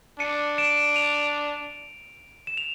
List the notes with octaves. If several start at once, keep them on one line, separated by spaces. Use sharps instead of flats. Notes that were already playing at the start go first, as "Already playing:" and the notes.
D4 C#7 D#7
D7 E7
D#7 F7
E7
F7